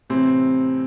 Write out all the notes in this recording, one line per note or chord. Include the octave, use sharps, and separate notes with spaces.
A2 C3 E3 C4